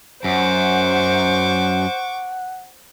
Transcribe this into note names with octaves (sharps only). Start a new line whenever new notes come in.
F#2 C5 F#5 C#6 D6